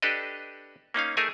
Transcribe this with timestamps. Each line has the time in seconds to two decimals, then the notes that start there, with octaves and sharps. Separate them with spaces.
0.02 D4 G4 A4 B4 D#5
0.94 A#3 C#4 D#4 F5
1.17 A3 D#4 G#4 A#4 E5 G#5